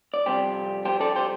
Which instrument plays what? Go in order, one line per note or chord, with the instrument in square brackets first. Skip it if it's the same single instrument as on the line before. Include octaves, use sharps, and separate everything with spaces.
[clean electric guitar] D5
F2 C3 G3 G4 C5
G4 C5
A4 D5
G4 C5